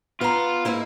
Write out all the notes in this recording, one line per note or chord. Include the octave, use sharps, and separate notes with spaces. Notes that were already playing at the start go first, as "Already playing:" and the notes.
B3 F4 A#5
G#2 A#3 E4